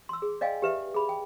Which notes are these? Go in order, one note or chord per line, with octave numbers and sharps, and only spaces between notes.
C6 E6
G#4
D5 D#5 F5 G5 G#5
G4 B4 E5
G#4 B5
G5